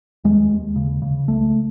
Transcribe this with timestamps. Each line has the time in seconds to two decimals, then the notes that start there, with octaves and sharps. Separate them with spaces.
0.24 D#2 G#3
0.51 D#2
0.76 C#3
1.02 C#3
1.28 C#2 A3